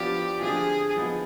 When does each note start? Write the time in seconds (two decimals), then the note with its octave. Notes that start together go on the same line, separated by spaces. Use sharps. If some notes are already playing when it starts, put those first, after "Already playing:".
Already playing: F3 B3 D4 F4 G4
0.41 D3 F3 C4 F4 G#4
0.96 F3 B3 D#4